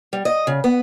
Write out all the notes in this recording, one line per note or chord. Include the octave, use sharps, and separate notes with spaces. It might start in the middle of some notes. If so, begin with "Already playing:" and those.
G3
D#5
C#3
B3